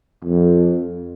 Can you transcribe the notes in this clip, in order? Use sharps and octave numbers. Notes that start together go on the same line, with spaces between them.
F2